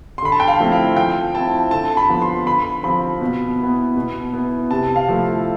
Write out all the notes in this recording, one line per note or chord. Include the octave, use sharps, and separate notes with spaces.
C6
D3 B5
A5
G5
F5
F3 A3 C4 E4
F5
F3 G5
C4 E4 A5
D3 A5
B5
F3 B3
C6
D3 B5
F3 C4 B5
B2
B3 E4
B2
B3 E4
C3 A5
F5
F3 A3 E4